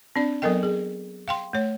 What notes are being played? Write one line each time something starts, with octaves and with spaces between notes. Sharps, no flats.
C4 D4 D5
F#3 B3 A4 A#4 D#5 G5
G#4
F5 G5 C6
A3 C#5